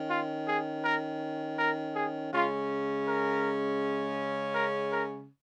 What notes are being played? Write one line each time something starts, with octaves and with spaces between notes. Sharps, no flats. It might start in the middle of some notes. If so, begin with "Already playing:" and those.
Already playing: D#3 C#4
F4
G#4
A#4
A#4
G#4
C#3 G#3 C#4 F4
A#4
A#4
A#4